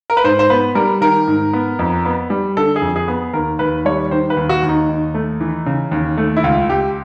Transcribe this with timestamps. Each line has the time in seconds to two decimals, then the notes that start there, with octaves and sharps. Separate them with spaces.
0.10 A#4
0.17 B4
0.24 G#2 C5
0.39 C5
0.50 B3 B4
0.75 G3 A#4
1.01 D#3 A#4
1.27 G#2
1.53 B3
1.79 F2
2.05 B3
2.30 G3
2.57 D3 A4
2.76 G#4
2.82 F2
2.96 G#4
3.08 B3
3.34 D#2 A#4
3.59 D#2 B4
3.85 G3 C#5
4.11 D#3 C5
4.30 B4
4.37 D#2
4.49 F#4
4.63 D#2
4.69 D#4
4.89 D#2
5.15 A3
5.41 E3
5.66 C#3
5.91 D#2
6.17 A3
6.37 E4
6.44 C#2 F4
6.69 C#2 G4